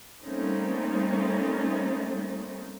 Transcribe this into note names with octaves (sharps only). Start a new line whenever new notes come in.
G3 A3 A#3 C4 C#4 D#4